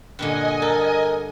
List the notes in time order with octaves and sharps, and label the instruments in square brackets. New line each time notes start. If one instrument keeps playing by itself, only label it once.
[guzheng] G2 A#2 D3 [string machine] D#5 G#5
[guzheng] A4 [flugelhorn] A#4